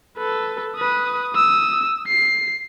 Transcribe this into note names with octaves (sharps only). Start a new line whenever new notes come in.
A4 B4
B4 D#6
D#6 E6
C7